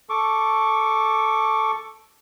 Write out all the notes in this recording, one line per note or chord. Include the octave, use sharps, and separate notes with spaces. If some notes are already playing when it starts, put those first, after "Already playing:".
A4 C#6 D6